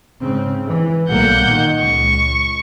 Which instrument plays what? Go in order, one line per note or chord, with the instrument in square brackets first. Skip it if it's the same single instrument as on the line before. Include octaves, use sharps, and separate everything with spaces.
[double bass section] G#2 C#3 C4
E3
[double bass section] B1 G3 A#3 [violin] F#5 G6
[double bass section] A#2 D#3
[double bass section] C#2 [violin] C#6